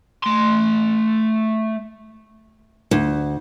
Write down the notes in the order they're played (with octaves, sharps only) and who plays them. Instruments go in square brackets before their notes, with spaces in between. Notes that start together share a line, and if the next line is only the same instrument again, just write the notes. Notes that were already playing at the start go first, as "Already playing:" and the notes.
[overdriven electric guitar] A3 C6
[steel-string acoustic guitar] D2